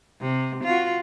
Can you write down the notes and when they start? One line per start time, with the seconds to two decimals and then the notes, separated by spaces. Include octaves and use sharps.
0.20 C3
0.64 F4 F#4